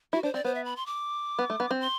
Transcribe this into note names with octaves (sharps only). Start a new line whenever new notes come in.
E4 F#4
D4 C5
C4 D5
B3 C5
E5
B5
C6
D6
B3
A3
B3
C4
C6